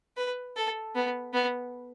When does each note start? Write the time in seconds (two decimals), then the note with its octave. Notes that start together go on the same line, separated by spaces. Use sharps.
0.17 B4
0.56 A4
0.95 B3
1.33 B3